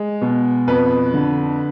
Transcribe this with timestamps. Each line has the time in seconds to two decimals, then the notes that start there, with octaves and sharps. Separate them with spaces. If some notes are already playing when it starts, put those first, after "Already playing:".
Already playing: G#3
0.22 B2
0.68 F2 B4
1.14 D3